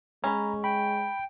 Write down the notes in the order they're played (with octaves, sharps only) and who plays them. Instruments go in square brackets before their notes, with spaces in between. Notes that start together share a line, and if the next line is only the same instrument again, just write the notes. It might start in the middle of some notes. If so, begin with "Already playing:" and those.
[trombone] G#3 [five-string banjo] C#4 [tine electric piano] A#5 B5
[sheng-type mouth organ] G5 [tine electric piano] B5